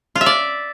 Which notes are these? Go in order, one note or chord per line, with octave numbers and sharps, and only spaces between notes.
F4
E5
D5